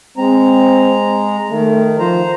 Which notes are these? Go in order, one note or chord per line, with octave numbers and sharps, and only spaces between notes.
G#3 C4 A#5
D#3 A3
F3 C5 A#5